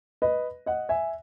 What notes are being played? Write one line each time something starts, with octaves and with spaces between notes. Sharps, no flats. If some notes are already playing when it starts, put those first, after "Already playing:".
B4 D#5
D#5 F#5
E5 G#5